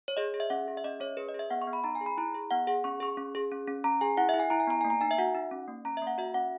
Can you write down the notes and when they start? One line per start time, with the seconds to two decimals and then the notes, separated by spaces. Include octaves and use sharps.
0.08 C#5
0.17 G#4 D#5
0.34 G#4
0.40 E5
0.50 C#4 F#5
0.68 G#4
0.77 E5
0.84 C#4 D#5
1.00 C#4 C#5
1.17 G#4 B4
1.28 D#5
1.34 G#4
1.39 E5
1.50 B3 F#5
1.62 C#6
1.67 B3
1.73 B5
1.84 D#4 A#5
1.95 G#5
2.01 G#4
2.06 B5
2.18 E4 A#5
2.34 G#4
2.51 B3 F#5
2.67 G#4 F#5
2.84 C#4 C#6
3.00 G#4 C#6
3.17 C#4
3.35 G#4
3.51 C#4
3.67 C#4
3.84 C#4 A#5
4.01 G#4 G#5
4.17 E4 F#5
4.29 E5
4.34 E4
4.40 G#5
4.50 E4 A#5
4.60 G#5
4.67 B3 A#5
4.81 A#3 G#5
4.90 A#5
5.01 D#4 G#5
5.11 E5
5.18 F#4 F#5
5.35 D#4
5.51 C#4
5.68 A#3
5.85 C#4 A#5
5.97 E5
6.02 A#3
6.07 F#5
6.18 F#4 E5
6.34 C#4 F#5